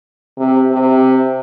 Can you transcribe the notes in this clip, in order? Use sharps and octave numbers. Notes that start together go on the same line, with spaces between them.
C3
C3